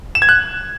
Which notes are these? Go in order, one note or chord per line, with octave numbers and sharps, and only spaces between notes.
E7
G#6
F#6